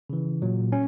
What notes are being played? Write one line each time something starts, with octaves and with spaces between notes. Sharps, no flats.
C#3 E3
A#2 F#3
C#4